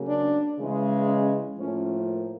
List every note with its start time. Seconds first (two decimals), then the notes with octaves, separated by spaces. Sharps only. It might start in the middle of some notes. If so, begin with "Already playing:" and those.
Already playing: C#3 F#3 A#3
0.08 D4
0.58 C#3 E3 G#3
1.08 C#4
1.58 A2 F3 A#3 C#4